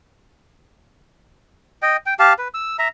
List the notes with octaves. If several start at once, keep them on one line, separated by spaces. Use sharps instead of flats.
D#5 G5
G5
G4 F5 A5
B4
E6
E5 A#5